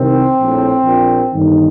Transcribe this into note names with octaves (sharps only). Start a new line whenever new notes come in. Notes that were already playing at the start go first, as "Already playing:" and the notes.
Already playing: C2 C3 D#3 C4
A#1 A2
A#1 A#2
G1 G2 D#3 D#4